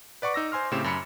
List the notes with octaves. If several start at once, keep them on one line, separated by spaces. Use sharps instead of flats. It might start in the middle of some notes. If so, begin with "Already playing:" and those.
B4 D5 F#5 C#6 D6
D#4 E6 A#6
C5 G#5 C6 F6
A2 C#3 C4 G4 E7
F#2 B5 C#7